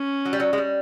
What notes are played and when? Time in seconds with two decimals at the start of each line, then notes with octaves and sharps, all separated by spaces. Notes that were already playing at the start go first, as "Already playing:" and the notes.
Already playing: C#4
0.25 F#3
0.33 G3
0.40 F#3
0.53 G#3
0.58 G3